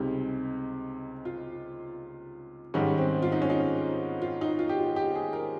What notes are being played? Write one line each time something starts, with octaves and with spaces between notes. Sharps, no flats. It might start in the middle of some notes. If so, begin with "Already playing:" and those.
Already playing: C#2 C3 G3 D#4
F4
G#2 D#3 G3 C#4
C4
F4
D#4
C#4
D#4
F4
D#4
F4
G4
F4
G4
G#4
A#4